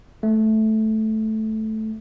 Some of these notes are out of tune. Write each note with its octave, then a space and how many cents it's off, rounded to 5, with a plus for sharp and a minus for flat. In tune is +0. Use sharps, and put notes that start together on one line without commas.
A3 -10